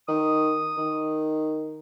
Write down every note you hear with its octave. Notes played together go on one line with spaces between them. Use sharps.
D#3 D#6
D#3